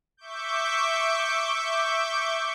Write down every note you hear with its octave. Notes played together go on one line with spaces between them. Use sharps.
E5 C#6 D6 G6